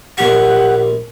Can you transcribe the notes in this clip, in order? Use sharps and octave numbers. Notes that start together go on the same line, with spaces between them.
A#1 G4 F#5 C#6